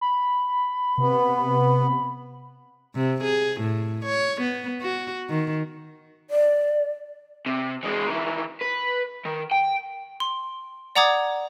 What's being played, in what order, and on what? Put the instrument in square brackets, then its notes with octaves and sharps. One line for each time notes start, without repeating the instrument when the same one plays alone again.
[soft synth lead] B5
[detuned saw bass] C3 [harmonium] B3
[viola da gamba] C3
G#4
A2
C#5
B3
F#4
D#3
[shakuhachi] D5
[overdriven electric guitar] C3
E3 G#3
D#3 E3
B4
D#3
G5
[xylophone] C6
D5 F#5 A#5 D6 D#6 G#6